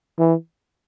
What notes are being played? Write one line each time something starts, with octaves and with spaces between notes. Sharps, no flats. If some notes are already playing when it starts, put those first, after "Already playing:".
E3